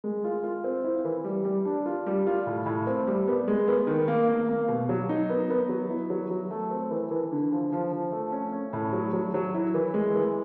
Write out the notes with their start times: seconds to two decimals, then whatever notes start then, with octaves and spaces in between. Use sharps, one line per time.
0.04 G#3
0.24 F4
0.43 F4
0.64 C4
0.84 E4
1.05 E3
1.24 G3
1.45 G3
1.65 D4
1.86 F4
2.06 G3
2.27 F4
2.46 A2
2.66 A2
2.87 C4
3.07 G3
3.28 B3
3.48 G#3
3.68 B3
3.87 D#3
4.08 A#3
4.28 A#3
4.48 A#3
4.68 B2
4.89 F#3
5.09 D#4
5.30 B3
5.50 B3
5.69 F#3
5.90 E4
6.10 F#3
6.30 F#3
6.51 A3
6.71 C4
6.90 E3
7.11 E3
7.32 D3
7.52 F3
7.72 F3
7.92 F3
8.12 A3
8.32 C#4
8.52 C#4
8.73 A2
8.93 F#3
9.13 F#3
9.34 F#3
9.54 E4
9.74 E3
9.94 G#3
10.15 E3